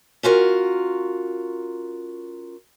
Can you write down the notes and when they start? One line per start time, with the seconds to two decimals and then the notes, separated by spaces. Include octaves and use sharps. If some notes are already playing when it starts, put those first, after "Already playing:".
0.23 C#4 F4 F#4 A#4